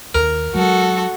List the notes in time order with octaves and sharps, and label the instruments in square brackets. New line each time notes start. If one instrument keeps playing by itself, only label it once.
[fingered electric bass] D#2 [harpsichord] A#4
[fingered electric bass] F#3 G#3 [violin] F#4 A4